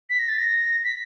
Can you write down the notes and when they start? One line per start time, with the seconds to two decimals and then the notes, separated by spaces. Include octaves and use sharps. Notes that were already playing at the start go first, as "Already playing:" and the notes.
0.10 B6
0.19 A#6
0.29 A6
0.38 A#6
0.84 B6